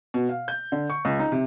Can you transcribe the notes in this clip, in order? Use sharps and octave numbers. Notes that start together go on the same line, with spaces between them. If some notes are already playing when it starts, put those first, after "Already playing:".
B2
F5
G6
D3
C#6
C#2
D#4
C3